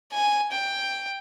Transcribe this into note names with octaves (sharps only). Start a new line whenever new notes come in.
G#5
G5